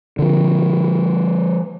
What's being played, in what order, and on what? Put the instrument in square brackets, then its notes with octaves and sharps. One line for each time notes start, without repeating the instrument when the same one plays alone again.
[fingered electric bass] D3 F3